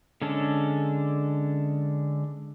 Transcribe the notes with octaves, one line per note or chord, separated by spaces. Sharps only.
D3 G#3 C#4 D4 A4